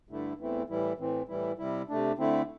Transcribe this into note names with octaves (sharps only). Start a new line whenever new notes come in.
G2 D3 A3 E4
E2 E3 A3 C4 E4
A2 E3 G3 E4
A2 E3 C4
A2 E3 G3 E4
C3 G3 E4
C3 A3 D4
D3 A3 C4 E4